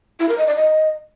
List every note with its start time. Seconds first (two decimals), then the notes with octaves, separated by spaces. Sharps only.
0.20 E4
0.29 A#4
0.38 D#5
0.47 D5
0.56 D#5